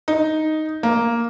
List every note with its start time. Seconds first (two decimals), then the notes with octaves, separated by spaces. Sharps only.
0.08 D#4
0.83 A#3